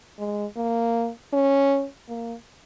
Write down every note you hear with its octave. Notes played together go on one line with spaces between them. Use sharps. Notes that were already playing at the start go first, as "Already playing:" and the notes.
G#3
A#3
C#4
A#3